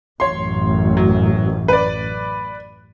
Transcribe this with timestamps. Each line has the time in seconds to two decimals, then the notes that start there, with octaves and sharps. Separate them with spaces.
0.20 A1 F#2 C#5 C6
0.97 F#3
1.68 B4 D5